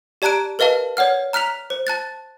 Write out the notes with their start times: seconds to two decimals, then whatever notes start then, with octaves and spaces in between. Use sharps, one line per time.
0.22 G4 D5 A5 A#5 F#6 D7
0.59 A#4 B4 D#5 F5 A5
0.97 C#5 D5 F#5 F6
1.33 A#5 F6 F#6 B6 F7
1.70 C5
1.87 A5 F#6 A6